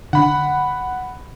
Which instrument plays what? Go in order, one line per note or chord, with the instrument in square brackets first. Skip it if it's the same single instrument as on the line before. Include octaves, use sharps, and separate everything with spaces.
[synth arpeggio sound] D3 [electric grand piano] F#5 B5